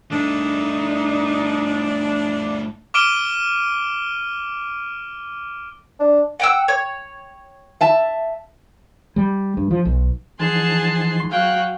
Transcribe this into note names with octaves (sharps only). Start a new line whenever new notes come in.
G2 A3 D4 D#4
D6 F6 D7 D#7 G7
D4
F#5 G5 E6
C#5
E5 A5
G3
G2
F3
B1
E3 F3 D#4 G#4 F#5 A5 C6
F#3 F#4 F5 G5 F#6